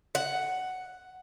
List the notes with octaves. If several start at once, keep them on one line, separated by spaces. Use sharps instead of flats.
F#5